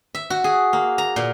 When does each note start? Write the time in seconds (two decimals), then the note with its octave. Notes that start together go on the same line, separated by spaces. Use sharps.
0.15 E5
0.30 F#4
0.44 G#4
0.73 A#3
0.98 A#5
1.16 A#2